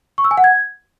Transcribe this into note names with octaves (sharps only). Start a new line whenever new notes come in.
C#6
E6
G#5
F#5
G#6